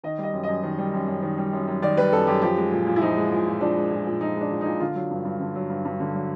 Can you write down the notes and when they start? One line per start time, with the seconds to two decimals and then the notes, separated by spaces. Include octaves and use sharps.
0.04 D#3 D#5
0.18 G3
0.23 D#5
0.33 F#2
0.43 D#5
0.48 F#2
0.63 D#3
0.79 G3
0.93 F#2
1.08 F#2
1.22 D#3
1.38 G3
1.53 F#2
1.68 F#2
1.82 D#3 D5
1.97 G3 B4
2.12 F#2 A4
2.27 F#2 G4
2.42 F3 G4
2.57 G#3
2.72 A#2
2.87 A#2
2.96 E4
3.01 F3 D#4
3.17 G#3
3.32 A#2
3.47 A#2
3.61 F3 D4
3.77 G#3
3.91 A#2
4.06 A#2
4.21 F3 D#4
4.36 G#3
4.41 D4
4.51 A#2
4.61 A#2 D#4
4.80 D3 F4
4.95 F#3
5.11 G2
5.25 G2
5.40 D3
5.55 F#3
5.70 G2
5.85 G2
6.00 D3
6.15 F#3